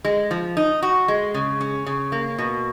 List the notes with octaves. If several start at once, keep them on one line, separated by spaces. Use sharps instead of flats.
G#3
F3
D#4
F#4
G#3
C#3
C#4
C#3
A#3
B2